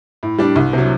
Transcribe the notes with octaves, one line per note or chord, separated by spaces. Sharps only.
A2
G3 D4
C2
C3 F#3